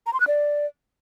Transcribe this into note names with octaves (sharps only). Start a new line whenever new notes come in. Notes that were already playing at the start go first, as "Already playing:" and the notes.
A#5
C6
F#6
D5